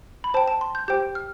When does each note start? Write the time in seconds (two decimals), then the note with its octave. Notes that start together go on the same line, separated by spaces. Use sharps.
0.24 B5
0.34 C5 G5 A5
0.48 A5
0.61 C6
0.75 G6
0.88 G4 C5 G5 G6
1.15 F6